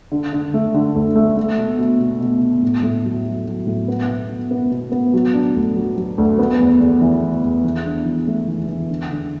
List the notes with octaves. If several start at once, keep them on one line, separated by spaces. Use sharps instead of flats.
D3
D3
A3
D3
D2
A3
A3
B2
B2
B2
B2
B2
A2
A2
F#3
F#3
F#3
A2
B3
B2
B2
B3
B2
B3
F#3
D4
D2
F#3
F#3
D2
B3
E2
E2
E3
E2
E2
E3
D4
E3
A3
E3
E3
D3
D3